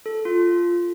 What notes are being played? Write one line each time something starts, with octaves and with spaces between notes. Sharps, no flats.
A4
F4